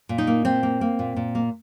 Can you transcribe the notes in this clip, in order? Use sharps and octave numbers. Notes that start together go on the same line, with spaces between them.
A#2
D#4
A#3
A#2 C4
A#3
A#3
A#2
A#2
A#3